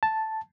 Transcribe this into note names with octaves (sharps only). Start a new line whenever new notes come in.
A5